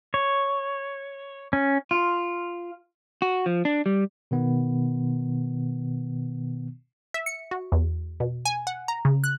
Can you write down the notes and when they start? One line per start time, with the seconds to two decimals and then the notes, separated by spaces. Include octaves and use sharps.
0.14 C#5
1.53 C#4
1.91 F4
3.22 F#4
3.46 F3
3.65 D4
3.86 G3
4.31 B2 D#3 B3
7.14 E5
7.26 C#7
7.51 F#4
7.72 E2
8.20 B2
8.45 G#5
8.67 F#5
8.88 A#5
9.05 C#3
9.24 F#6